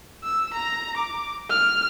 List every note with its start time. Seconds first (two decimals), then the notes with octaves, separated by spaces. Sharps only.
0.23 E6
0.54 A#5
0.97 D6
1.50 F6